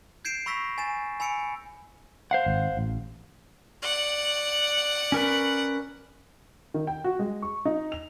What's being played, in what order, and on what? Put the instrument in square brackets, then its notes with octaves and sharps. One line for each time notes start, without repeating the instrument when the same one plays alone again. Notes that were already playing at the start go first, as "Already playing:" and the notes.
[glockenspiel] G6 G#6 C7 D7 E7
B5 C#6 E6 A#6 B6
G#5 A6 E7
G#5 B5 E6 C#7 D7
[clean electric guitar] C5 F5 F#5
[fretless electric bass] G#1
A1
[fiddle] D5 F#5
[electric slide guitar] C#4 A#4 B4
[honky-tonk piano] D#3
G5
F#4
G#3
C#6
D#4
F7